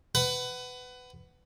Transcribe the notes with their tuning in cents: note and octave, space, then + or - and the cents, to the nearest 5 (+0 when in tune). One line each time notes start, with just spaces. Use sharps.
B4 +20 F#5 +20